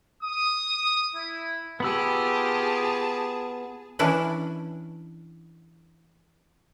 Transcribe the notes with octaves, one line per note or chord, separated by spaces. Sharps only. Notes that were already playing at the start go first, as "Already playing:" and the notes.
D#6
E4
B3 F4 G4 G#4 A5 B5 E6
E3 C#4 D4 E4 B4